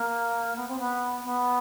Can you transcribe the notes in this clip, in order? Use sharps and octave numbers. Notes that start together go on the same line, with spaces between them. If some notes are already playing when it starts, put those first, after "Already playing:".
Already playing: A#3
B3
C4
B3
B3